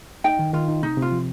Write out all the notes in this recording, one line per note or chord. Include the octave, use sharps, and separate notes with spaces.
D#4 G5
D#3
D#3 F4
D#4
C3 D#4
C3 F4
F3